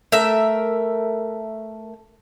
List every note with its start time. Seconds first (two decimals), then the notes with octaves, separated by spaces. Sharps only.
0.12 A3 A#4 E5